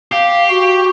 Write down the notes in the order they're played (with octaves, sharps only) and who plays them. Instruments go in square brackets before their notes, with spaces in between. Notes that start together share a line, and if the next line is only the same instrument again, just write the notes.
[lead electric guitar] G4 [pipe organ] F5
[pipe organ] F#4